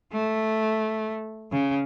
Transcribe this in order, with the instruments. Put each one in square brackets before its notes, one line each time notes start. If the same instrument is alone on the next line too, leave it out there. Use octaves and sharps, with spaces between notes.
[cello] A3
C#3